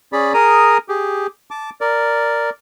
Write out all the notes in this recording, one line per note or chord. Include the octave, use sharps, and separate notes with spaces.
C#4 G#4 D5 B5
G#4 A#4 A#5 D#6
G4 G#4
A5 D6
A#4 D5